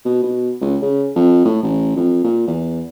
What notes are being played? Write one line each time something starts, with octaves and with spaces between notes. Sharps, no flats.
B2
B2
C#2
C#3
F2
A2
A1
F2
A#2
E2